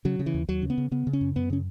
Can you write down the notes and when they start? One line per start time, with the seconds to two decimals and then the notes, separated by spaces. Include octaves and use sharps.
0.05 C#3 F#3
0.19 C#3
0.26 E3
0.34 D#2
0.49 D#2 F#3
0.62 C#3
0.70 B3
0.78 C#3
0.91 C#3 B3
1.07 C#3
1.13 C#4
1.21 F#2
1.36 F#2 B3
1.50 C#3 C#4